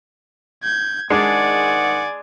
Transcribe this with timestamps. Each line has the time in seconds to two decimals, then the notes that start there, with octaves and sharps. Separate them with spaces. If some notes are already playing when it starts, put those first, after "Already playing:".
0.63 G6 G#6
1.10 G#2 D#3 G#3 D4 D5 F#5 G#5